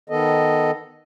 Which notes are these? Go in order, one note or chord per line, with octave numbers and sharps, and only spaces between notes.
D#3 B3 A4 D#5